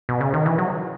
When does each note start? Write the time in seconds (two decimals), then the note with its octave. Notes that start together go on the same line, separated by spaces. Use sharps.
0.09 B2
0.21 C#3
0.34 D#3
0.46 E3
0.58 F#3